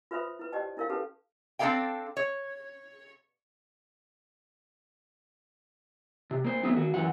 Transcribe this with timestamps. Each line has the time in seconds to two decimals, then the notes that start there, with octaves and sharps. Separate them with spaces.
0.11 F4 B4 C5 E5 B5 D#6
0.39 E4 B4
0.52 G4 C5 D5 D#5 G5 A5
0.77 D4 E4 A#4 C#5 F5
0.89 C#4 E4 G4 A4 B4 A5
1.59 C4 D4 F4 A4 F5 G5
2.17 C#5
6.31 C3
6.44 A#3 C5
6.63 F#3 A3 B3 C4 D#4
6.76 D#3 F#4
6.94 F#2 E3 F#5